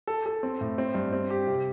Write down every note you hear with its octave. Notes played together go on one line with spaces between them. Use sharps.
A4
A4
C4
A2
C4
G2
C4
G4
C3